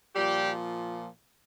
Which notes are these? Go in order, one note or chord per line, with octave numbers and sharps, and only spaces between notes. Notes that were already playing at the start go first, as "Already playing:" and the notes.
A#2 F3 G3 G4